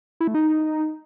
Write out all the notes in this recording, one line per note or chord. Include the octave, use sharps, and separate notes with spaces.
E4
A3
D#4